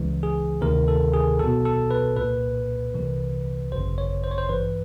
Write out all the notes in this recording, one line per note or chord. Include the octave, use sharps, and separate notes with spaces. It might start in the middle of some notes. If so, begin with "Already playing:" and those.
Already playing: C#2 C#3 E3
G#4
D2 C3 D#3 A#4
A4
G#4
B1 B2 A4
A4
B4
C2 A#2 B4
C2 C3 E3
G#1 F#2 C#3 C5
C#5
C5
C#5
C5
A1 G2 E3 B4